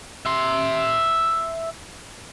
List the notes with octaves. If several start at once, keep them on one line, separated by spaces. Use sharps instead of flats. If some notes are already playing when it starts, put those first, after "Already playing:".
E5 C6